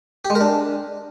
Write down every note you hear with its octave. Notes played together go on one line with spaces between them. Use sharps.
G4
G#3
A#4
D4